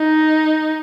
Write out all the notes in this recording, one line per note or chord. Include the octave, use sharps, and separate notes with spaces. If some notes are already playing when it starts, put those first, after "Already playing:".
Already playing: D#4